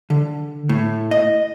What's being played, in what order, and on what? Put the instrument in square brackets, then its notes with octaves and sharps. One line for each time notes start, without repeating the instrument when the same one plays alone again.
[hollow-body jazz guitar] D3
A2
D#5